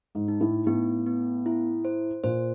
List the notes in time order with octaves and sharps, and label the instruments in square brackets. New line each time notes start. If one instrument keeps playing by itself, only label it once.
[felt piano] G#2
[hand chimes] D#4
[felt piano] A2
[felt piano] A2 [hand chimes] B3
[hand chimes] B3
E4
C5
[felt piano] A#2 [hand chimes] C5